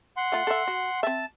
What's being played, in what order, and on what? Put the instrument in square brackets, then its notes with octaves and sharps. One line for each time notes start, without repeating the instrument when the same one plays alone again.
[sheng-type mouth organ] F#5 C6
[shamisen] A3 F4
A4 E5
F#4
[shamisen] C4 E5 [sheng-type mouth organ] A5